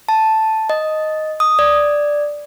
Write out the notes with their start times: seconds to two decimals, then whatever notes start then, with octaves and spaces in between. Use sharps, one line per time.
0.09 A5
0.70 D#5
1.40 D#6
1.59 D5